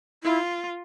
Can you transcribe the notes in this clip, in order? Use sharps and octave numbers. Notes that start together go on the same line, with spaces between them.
E4 F4